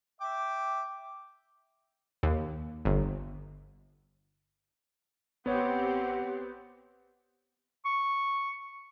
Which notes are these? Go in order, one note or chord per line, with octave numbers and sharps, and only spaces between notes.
E5 G5 D6
D#2
G1
A1 B3 C4 G4 C#5 F#5
C#6